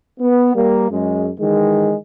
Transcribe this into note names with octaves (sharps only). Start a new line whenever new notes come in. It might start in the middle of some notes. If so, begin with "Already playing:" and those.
B3
G3 A#3
F#2 G#3
D#3 E3 G#3